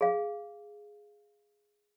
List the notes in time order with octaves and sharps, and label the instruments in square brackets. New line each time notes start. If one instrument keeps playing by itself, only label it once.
[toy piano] G#4 F5